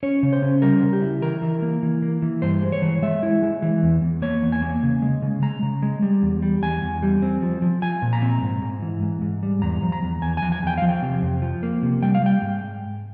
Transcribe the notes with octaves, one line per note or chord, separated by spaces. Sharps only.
C#4 C#5
C#3
C5
C#4
G3 A#4
C#3
G4
E4
E3 A#4
E3
A#3
E3
A#3
E3
G2 C5
G#3
C#5
E3
G#3 E5
E4
G#3
E3
E2
E2
A#3 C#5
E2
G#5
A#3
C#3
G#3
C#3
G#3 A#5
C#3
G#3
G3
E2
G3
E2 G#5
E2
G3
C4
F3
F3
F3 G#5
A#2
A#5
C4
G#2
G#2
E3
G#2
G#2
G3
E2 A#5
F3
A#5
E2
E2 G#5
F3 G#5
G#5
E2 G5
F3 F5
G5
C3
F2
F3
A#3
C3
G3 G5
F5
G3 G5
G#2